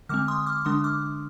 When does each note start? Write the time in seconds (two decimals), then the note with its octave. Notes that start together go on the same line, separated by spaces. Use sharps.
0.09 D3 G#3 C4 D6 F6
0.28 C6 D#6
0.46 D6 F6
0.65 D3 G#3 D4 C6 D#6
0.84 D6 F6